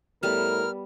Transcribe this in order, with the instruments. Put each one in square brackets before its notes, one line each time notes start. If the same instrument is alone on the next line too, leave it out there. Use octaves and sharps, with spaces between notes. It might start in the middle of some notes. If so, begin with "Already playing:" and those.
[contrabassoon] A2 [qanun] G3 B3 [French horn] A#4 [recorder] F6